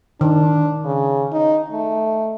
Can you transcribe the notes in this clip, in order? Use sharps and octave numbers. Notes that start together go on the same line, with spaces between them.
D#3 D4
C#3
D#4
A3